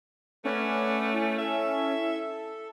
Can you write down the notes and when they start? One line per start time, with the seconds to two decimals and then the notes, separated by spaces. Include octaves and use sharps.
0.45 A3 C#4 B4 D5 F#5
1.13 E4
1.38 A4 E5